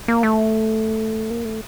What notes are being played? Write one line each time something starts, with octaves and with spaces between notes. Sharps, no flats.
A#3
A3
A#3
A3